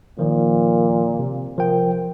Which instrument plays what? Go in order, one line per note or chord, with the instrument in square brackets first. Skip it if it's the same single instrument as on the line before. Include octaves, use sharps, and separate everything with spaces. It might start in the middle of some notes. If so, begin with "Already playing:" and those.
[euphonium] A#2 [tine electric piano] D#3 F3
[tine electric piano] C3
[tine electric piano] F3 G5 [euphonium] A#4